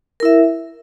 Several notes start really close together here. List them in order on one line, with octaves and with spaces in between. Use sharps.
A#4 E4 E5